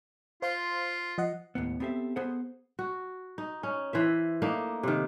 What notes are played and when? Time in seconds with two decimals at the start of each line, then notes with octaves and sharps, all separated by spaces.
0.42 F4 C5 F5 C6
1.18 F3 D#5 F#5
1.55 D#2 A2 B3
1.80 B3 C4 G4 A4 E5
2.16 B3 G#4 A4 C5 F#5
2.79 F#4
3.38 D#4
3.63 C#4 D#4
3.93 E3 C5 E5
4.42 A3 A#3 D4 D#4
4.83 C3 D#3